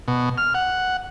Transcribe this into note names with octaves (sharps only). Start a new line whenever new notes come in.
B2
F6
F#5